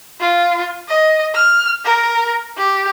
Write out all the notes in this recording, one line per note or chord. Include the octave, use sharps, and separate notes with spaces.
F4
D#5
F6
A#4
G4